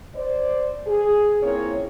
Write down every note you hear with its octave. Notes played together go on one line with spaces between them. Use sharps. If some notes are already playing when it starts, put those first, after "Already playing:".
C5 D5
G#4
A#3 C4 C#4 E4 F4 C#5